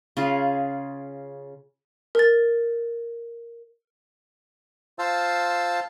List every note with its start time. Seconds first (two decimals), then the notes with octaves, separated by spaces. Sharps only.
0.17 C#3 F4 G#4
2.15 A#4 A6
4.99 F4 C5 F5 A5 E6